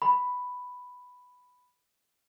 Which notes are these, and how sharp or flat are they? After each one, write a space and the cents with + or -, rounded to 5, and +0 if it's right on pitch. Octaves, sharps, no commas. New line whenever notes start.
B5 +5